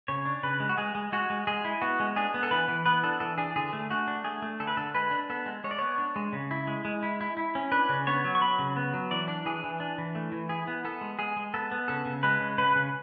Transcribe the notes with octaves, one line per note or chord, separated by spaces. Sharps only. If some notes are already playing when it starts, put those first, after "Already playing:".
C#3 C#5
D4
C#3 B4
G#3
F#4
G#3 G#4
G#3
G#3 F#4
G#3
G#3 G#4
E4
B3 F#4
G#3
D4 G#4
B3
A4
E3 B4
E3
B3 B4
D4 A4
E3 A4
D4 G#4
D3 G#4
A3
A3 F#4
D4
A3 G#4
A3
D3 A4
B4
D3 A4
G#3 B4
D4
B3 A4
G#3
G#3 C#5
D5
B3 C#5
D4
G#3
C#3
E4
G#3
G#3
E4
E4
E4
C#4
D4 B4
C#3
B3 C#5
F#3
C#6
F#3 B5
C#3
B3
F#3
E3 D5
D4
E3 G#4
E3
D4
E3
A3
E3
E4 G#4
B3
B3 A4
G#3
G#3 G#4
G#3
B3 A4
B3
C#3 A4
C#3
G#3 B4
C#3
C#3 B4
C#3